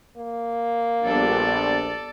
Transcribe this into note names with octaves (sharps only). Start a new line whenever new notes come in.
A#3
A#1 G3 B3 D4 A4 D5